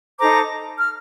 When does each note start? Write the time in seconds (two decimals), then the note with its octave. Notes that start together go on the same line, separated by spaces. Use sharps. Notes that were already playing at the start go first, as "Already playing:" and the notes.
0.18 D#4 A4 C5 A#5 D6
0.79 F6